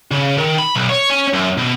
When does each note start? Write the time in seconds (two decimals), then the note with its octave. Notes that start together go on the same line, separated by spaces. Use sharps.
0.11 C#3
0.38 D#3
0.59 B5
0.75 B1
0.89 C#5
1.10 C#4
1.33 F#2
1.57 B2